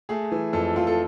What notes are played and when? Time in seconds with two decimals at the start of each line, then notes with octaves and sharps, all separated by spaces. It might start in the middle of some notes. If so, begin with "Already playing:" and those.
0.09 A3 G#4
0.32 E3
0.53 F2 A4
0.76 F2 F4
0.87 A4